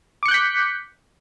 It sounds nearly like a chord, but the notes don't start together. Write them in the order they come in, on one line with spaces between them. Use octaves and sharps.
D6 C#7 F#6 G6 B6